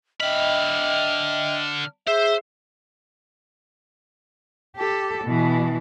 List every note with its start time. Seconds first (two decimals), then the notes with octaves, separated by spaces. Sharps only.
0.20 D3 D#5 E5 G5 B5 F6
2.07 G#4 C5 E5
4.76 G4 A4
5.25 B2 E3